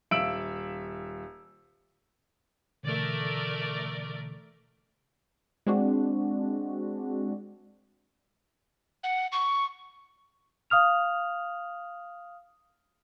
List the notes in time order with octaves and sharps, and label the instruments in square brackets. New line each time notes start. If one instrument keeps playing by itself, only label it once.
[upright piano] D#1 E5 F5 E6 D7 F#7
[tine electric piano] B2 D3 E3 [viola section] A3 A#4 D5
[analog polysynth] G#3 C4 D4 F#4
[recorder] F#5
C#6
[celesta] F5 D#6 F6 F7